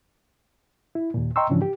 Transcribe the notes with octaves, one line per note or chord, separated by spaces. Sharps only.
E4
D#2 A#2
D#5 G5 A#5 C6 C#6 E6
G#2 C#3 E3 F3 C#4 D4
G4